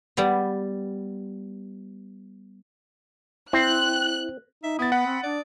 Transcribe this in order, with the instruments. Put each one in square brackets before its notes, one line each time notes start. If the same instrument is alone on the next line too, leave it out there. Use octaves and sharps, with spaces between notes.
[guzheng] G3 B3
[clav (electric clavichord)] C4 [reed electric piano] E4 [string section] F#6
[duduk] D#4 [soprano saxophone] E5
[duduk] B3 [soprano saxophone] E4 [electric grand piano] D#6 A6
[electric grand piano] F#5 [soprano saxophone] B5
[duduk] C4
[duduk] D4 [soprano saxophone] D5